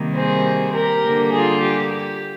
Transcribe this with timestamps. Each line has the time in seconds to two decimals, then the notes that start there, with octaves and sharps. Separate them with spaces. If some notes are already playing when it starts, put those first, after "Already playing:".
Already playing: C3 D#3 G3 A#3
0.15 G#4 C5
0.74 G4 A#4
1.04 D3 G3 A#3
1.33 F4 G#4
1.62 G4
1.92 G4